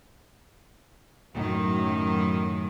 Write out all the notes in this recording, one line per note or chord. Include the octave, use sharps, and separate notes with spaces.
F#2 A2 D#3 F#3